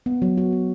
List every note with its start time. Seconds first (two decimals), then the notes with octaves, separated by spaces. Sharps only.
0.06 B3
0.22 F#3
0.38 F#4
0.53 B3